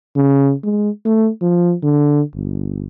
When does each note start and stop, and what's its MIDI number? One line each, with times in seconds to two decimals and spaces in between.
0.16 0.53 49
0.64 0.90 56
1.05 1.29 57
1.42 1.74 53
1.83 2.21 50
2.34 2.85 31